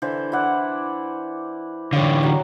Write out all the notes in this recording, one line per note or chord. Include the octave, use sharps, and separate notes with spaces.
D3 E3 C5
E4 D5 F#5
D3 E3 G3 C#5 F5
F#3